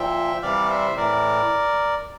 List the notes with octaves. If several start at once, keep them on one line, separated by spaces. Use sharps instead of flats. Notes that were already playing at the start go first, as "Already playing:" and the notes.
Already playing: A#2 F3 E5 G5
C3 E3 G3 D5 F5
F5
C5 E5
A2 E3 A#4 D5